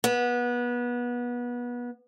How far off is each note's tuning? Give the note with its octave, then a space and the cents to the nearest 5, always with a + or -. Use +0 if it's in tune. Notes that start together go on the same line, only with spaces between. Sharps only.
B3 -25